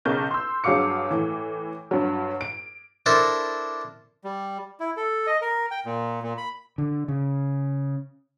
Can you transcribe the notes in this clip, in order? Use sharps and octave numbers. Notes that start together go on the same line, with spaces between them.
B1 C#3 A#4 G6
C6 E6
G2 F#3 G#4 F5 D6 C#7
A2 E3
G2 F#3
D7
D4 E4 A4 A#4 C5
G3
E4
A4
D#5
A#4
G5
A#2
A#2
B5
D3
C#3